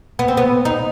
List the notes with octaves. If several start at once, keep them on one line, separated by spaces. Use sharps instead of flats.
B3
C4
B3
D#4